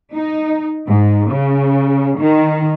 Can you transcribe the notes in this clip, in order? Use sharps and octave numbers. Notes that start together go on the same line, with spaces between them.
D#4
G#2
C#3
D#3